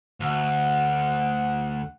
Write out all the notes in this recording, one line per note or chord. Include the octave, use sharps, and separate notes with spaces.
D2 F#5